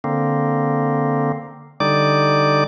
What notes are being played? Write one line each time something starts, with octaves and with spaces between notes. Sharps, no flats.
D3 A#3 C4
D3 G3 D#4 D5 D6